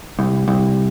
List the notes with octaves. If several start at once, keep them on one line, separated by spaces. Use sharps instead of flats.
C2
C2